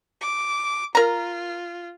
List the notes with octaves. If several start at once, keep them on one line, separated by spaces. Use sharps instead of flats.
D6
F4 A#4 A#5